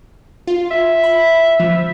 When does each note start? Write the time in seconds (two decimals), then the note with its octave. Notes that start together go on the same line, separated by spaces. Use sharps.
0.47 F4
0.71 E5
1.03 B5
1.60 F3